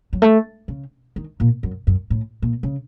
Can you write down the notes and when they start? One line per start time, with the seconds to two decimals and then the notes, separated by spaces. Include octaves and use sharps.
0.13 F#3
0.22 A3
0.68 C#3
1.16 D#3
1.40 A#2
1.63 F#2
1.87 F#2
2.10 A2
2.42 A#2
2.63 C#3